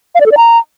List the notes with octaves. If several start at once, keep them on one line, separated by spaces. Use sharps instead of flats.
F5
D5
A4
D5
A#5